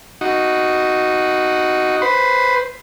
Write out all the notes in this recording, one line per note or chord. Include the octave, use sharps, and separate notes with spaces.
D#4 F#4
B4 C5